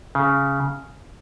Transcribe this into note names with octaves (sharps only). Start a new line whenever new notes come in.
C#3